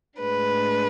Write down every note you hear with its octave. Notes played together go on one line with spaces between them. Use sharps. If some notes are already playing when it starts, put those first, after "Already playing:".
A2 G#3 D4 B4